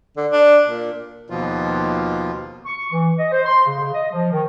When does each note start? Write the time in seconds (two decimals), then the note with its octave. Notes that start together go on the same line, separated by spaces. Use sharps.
0.17 D3
0.31 D4
0.66 A#2
1.30 D#2 B2 F3 F4
2.65 C#6
2.91 E3
3.18 D#5
3.32 C5
3.45 C6
3.65 C#3
3.79 C#3
3.94 D#5
4.11 F3
4.31 D#3